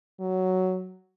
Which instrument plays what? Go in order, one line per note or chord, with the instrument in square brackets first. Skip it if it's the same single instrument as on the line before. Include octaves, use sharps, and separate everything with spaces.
[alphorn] F#3